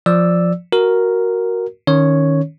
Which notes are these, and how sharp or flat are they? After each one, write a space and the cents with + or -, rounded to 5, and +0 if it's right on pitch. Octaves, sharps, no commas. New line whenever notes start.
F3 +0 D5 +0 E6 +0
F#4 +0 A#4 +0
D#3 +0 C#4 +0 C#5 +0